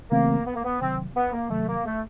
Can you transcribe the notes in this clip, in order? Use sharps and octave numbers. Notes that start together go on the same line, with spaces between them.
C#3 E3 A3 A#3 C4
B3
A#3
B3
C3 D#3 F#3 C4
B3
A#3
C3 D#3 F#3 A3
A#3
A3